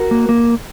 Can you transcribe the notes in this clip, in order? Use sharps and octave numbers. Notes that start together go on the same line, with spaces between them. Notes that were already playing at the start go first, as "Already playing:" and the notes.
Already playing: F#4 A#4
A#3
A#3